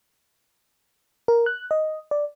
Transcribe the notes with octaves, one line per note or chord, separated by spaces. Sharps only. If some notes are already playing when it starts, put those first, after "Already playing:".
A#4
F#6
D#5
D5